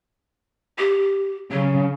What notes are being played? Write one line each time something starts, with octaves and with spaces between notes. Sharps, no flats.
G4
C#3 F#3